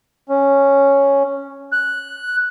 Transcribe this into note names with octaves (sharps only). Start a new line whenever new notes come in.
C#4
F#6